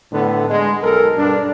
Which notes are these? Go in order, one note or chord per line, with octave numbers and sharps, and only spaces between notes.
A2 D3 B3
G#3
B1 A4 A#4
G2 D4